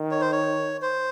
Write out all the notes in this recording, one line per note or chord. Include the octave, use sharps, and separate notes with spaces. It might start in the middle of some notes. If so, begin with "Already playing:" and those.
Already playing: D#3
C#5
C5
C#5
C5